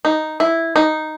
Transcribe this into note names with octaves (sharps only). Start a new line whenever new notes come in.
D#4
E4
D#4